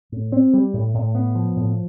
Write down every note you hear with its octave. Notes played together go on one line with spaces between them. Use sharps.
A2
C4
G3
A2
A2
B3
F3
A2